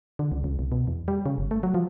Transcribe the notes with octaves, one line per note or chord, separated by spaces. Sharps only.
D3
C#2
C#2
C2
B2
E2
G3
C#3
G1
A3
F#3
F3